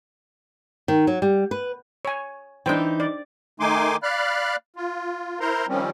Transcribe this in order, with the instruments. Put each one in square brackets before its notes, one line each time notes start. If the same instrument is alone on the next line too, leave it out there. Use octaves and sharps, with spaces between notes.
[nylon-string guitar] D#3
F#3
G3
B4
[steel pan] C#5 G#5
[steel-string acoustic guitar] E3 D#4 [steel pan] D4 C5 G5
[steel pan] D5
[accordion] D#3 A3 D#4 G#5 C6 D6
D5 F5 B5 F6 F#6
F4
E4 A#4 C5 A#5 C6
D#3 F3 G3 C4 C#4